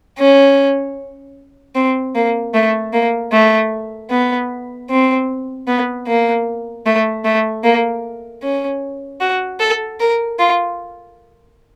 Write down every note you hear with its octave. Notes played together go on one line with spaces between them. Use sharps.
C#4
C4
A#3
A3
A#3
A3
B3
C4
B3
A#3
A3
A3
A#3
C#4
F#4
A4
A#4
F4